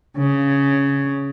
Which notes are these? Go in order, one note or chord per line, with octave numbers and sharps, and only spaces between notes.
C#3